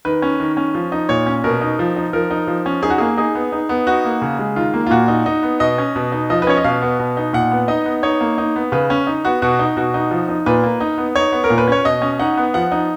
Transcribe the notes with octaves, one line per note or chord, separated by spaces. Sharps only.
D#3 B4
C#4
D#3
C#4
F3
D#4
A#2 C#5
C#4
B2 A#4
D#4
F3
D#4
F3 A#4
D#4
F3
C#4
D#4 G#4
F#4
A#3 G#4
D#4 G#4
B3
D#4
B3
D#4 F#4
A#3
C#3
G#3
D#3 F4
A#3
F4
A#2 F#4
D#4
D#4
B3
B2 D#5
C#4
B2
D#4
F3 D#5
B4
C#4 C#5
D#5
B2 F5
B3
B2
D#4
A#2 F#5
B3
D#4 D#5
B3
D#4 C#5
A#3
D#4
B3
C#3 B4
C#4
D#4
B3 F#4
B2 F#4
D#4
B2 F#4
D#4
F3
D#4
A#2 B4
A#3
D#4
B3
D#4 C#5
B3
A#4
A#2
B4
C#4 C#5
B2 D#5
C#4
D#4 F#5
B3
F3 F#5
D#4